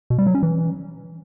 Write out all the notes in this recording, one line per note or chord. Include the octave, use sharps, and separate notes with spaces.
B2
G3
F#3
C#4
E3